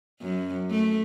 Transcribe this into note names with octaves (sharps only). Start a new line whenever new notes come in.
F#2
A3